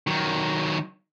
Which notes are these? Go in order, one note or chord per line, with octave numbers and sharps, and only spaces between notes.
D#3 F#3